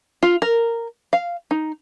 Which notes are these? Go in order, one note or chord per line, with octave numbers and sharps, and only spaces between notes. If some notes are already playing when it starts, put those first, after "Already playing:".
F4
A#4
F5
D#4